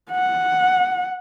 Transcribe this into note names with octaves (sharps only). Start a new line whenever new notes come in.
F#5